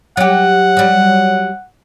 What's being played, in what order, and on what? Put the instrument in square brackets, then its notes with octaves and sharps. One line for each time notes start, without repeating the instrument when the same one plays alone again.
[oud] F#3 G4 [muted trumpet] F#5
[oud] F#3 G3